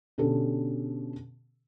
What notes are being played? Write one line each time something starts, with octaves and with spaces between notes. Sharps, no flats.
B2 D3 C#4 G4 A4